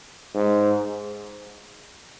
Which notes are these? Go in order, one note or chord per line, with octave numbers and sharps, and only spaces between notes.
G#2